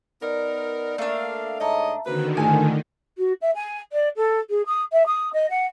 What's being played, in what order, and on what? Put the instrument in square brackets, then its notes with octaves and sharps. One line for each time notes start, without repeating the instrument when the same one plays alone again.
[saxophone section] B3 D#4 A#4 [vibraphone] D5
[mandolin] A3 D4 [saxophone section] A#3 F5
[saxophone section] G#2 C#5 D#5 [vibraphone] E5 A5 A#5
[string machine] D3 D#3 [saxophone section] A#3 C4 B4 [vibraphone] F#4
[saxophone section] G#2 [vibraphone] A3 D#4 F4 [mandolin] G#5
[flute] F#4
E5
G#5
D5
A4
G#4
D#6
E5
D#6
D#5
F#5